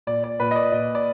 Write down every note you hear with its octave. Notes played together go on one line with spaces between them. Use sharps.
A#2 D5
D5
A#2 B4
D#5
D5
A#2 D#5
D5